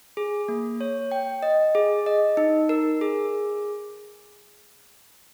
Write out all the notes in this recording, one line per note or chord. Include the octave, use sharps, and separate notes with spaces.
G#4
A#3
C#5
G5
D#5
G#4
D#5
D#4
A#4
G#4